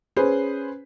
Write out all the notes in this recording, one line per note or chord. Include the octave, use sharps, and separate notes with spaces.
C#4 G#4 B4 C5